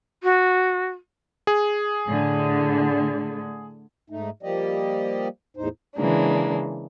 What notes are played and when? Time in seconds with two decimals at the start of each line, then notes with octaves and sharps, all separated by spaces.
0.23 F#4
1.47 G#4
2.08 A2 D3
4.10 G#2 A3 D#4
4.43 F3 G3 A#3 G4 D5 D#5
5.57 E2 A2 D#4 C5
5.97 C#3 E3 G#3 A#3 D4